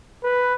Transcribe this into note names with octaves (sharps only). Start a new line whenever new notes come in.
B4